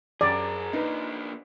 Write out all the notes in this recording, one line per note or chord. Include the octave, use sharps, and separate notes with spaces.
F#2 G#4 A#4 D5
A#3 D4 D#4 B4